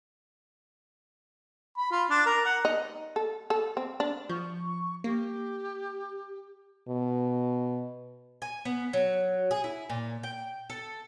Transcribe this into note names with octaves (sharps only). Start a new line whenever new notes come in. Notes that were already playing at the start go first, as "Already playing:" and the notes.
B5
F4
D4
A#4
F#5
D#4
A4
A4
C4
D4
F3 C#6
A#3 G4
B2
G#5
B3
F#3
G#4
E4
A#2
G5
A4